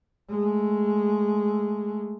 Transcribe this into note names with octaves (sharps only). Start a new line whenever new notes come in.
G#3 A3